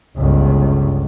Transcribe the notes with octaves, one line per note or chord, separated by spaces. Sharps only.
G1 C#2